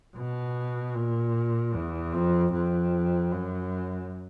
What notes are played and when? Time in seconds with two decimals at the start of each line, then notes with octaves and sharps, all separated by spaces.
0.16 B2
0.95 A#2
1.74 E2
2.13 F2
2.53 F2
3.32 F#2